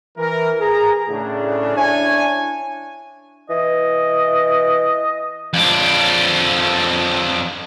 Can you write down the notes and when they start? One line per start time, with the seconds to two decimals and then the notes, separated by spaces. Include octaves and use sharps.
0.18 E3 A#4
0.59 G#4 A#5
1.09 A2 C#3 D4
1.76 D4 E4 C#5 G#5
3.50 E3 D#5
5.53 F2 D4